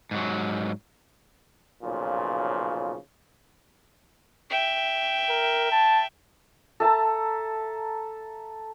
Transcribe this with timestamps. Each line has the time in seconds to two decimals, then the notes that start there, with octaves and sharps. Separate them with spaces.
0.11 G#2 F#3
1.82 B1 A#2 C#3 F3
4.50 E5 G5
5.30 A#4
5.72 A5
6.80 A4 E5 A5 A#5